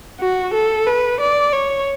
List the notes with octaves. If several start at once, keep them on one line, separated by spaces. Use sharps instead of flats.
F#4
A4
B4
D5
C#5